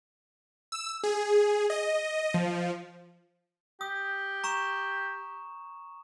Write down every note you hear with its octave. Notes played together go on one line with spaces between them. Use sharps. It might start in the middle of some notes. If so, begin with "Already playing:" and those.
E6
G#4
D#5
F3
G4 D#6
A#5 C#6 E7